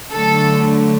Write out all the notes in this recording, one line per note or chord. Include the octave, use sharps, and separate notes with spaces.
D3 F#3 A3 A4